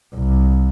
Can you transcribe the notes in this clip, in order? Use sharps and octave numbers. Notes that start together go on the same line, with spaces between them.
C2